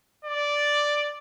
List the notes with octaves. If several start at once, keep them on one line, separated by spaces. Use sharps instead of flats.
D5